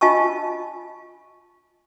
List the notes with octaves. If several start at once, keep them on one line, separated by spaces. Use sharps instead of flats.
F4 D#5 G#5 A5 C#6